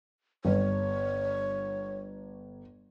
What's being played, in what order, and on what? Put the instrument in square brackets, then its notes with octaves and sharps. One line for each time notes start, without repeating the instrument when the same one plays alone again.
[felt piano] G1 [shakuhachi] C#5